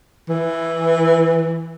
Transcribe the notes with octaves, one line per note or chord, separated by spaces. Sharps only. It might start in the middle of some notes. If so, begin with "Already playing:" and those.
E3